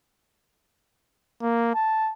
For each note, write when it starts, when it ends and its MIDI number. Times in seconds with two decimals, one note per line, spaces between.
1.42 1.73 58
1.75 2.13 81